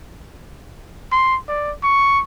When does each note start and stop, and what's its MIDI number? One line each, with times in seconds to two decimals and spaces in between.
1.12 1.37 84
1.48 1.73 74
1.83 2.22 85